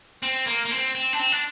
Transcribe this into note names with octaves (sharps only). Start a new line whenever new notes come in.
C4
A#3
A#3
C4
C4
D4
C4
D4